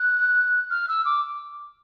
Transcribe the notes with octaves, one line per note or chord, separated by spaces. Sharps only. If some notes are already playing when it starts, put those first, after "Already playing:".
Already playing: F#6
F6
E6
D6